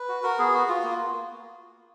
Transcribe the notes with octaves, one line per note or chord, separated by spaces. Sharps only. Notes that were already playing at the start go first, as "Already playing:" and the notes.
Already playing: B4
F#4
F#4 A#4
B3 G#4
F#4
F4
A#3